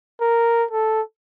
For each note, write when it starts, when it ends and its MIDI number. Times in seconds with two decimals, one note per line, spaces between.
0.22 0.65 70
0.71 1.01 69